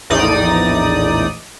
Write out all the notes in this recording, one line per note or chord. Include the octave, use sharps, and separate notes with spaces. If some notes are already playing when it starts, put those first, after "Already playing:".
A#1 E2 A2 D#4 D5 D#6